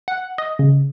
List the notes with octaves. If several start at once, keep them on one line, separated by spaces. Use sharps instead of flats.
F#5
D#5
C#3